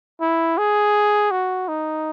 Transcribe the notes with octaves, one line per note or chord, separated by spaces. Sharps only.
E4
G#4
F#4
D#4